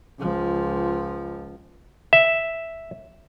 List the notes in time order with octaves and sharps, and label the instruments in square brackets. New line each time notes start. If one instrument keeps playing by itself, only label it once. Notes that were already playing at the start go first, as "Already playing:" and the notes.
[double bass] C#2 F3
[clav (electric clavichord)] E5